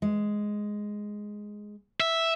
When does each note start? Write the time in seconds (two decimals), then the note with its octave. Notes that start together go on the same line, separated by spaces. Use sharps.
0.02 G#3
2.00 E5